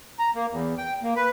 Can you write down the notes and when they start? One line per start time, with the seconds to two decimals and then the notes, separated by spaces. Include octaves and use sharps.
0.19 A#5
0.35 A#3
0.51 E2
0.78 G5
1.03 A#3
1.16 B4